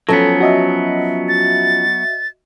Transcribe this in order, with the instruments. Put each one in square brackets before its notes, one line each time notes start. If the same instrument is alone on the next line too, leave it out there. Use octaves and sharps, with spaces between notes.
[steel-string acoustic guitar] F3 C#4 [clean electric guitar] F#3 B3 [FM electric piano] A4
[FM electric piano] F#4 D#5 E5
[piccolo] A6